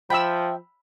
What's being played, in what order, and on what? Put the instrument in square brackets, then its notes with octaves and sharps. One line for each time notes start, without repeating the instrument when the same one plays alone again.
[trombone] F3 [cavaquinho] E5 G5 [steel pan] B5 E6